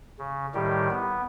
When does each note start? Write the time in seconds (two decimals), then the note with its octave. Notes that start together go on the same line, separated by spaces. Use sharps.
0.19 C#3
0.54 A2 D#3 G3 G4
0.90 B3